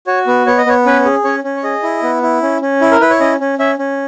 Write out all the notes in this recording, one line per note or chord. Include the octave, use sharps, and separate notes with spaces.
F#4 C#5
B3
B3 C#5
D#5
B3 C#5
C#4 B4
G#4
C#4 C#5
C#4
C#5
G#4 D#5
E4
B3
E4
C#4
C#4
E4
A#4
E4 B4
C#5
C#4 D#5
C#4
C#4 E5
C#4